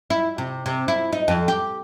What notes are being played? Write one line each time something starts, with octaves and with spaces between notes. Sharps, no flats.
E4
C3
C3
E4
D#4
F2
G4